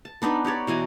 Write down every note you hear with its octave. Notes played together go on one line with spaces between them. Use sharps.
A5
B3 D4 D#4 B4
D#4 G4 C#5 D5
B2 E3 G#5 A#5